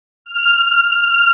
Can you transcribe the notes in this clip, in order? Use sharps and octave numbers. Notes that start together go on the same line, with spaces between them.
F6